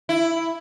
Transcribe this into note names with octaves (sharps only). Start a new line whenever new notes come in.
E4